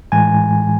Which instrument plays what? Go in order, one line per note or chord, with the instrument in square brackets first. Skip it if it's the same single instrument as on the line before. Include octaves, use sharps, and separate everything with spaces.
[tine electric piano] A2 E3 G#3 G#5